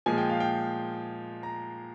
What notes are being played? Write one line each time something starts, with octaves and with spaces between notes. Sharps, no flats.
A#2 F3 G#3 G#5
G5
F5
G5
A#5